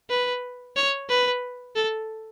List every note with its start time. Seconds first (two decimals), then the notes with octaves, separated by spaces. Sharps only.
0.10 B4
0.76 C#5
1.09 B4
1.76 A4